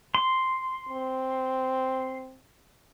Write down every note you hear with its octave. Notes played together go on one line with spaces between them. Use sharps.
C6
C4